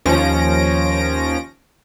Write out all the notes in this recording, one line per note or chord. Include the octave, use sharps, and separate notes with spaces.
D#2 F3 C#4 A#6 D7